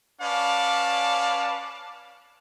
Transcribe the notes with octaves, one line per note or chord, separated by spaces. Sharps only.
C#4 B4 D5 F5 A5